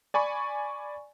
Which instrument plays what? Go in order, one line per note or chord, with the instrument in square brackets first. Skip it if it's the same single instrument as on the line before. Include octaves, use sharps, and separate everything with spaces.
[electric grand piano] D5 G#5 B5 C#6